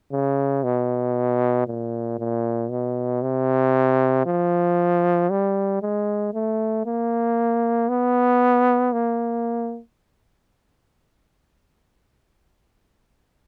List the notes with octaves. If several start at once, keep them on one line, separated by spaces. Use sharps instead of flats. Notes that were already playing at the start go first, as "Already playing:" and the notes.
C#3
B2
A#2
A#2
B2
C3
F3
G3
G#3
A3
A#3
B3
A#3